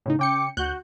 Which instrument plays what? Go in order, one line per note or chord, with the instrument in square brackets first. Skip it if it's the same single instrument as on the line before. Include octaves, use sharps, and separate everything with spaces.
[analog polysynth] A2 C#3 D#4
[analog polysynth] C#3 G5 C#7 [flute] D6
[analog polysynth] D2 F#6 G6 [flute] F#4